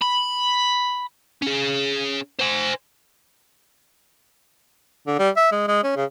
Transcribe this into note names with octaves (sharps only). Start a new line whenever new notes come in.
B5
C#4 G#4
C5 G#5
D3
G3
E5
G#3
G#3
C#4
C#3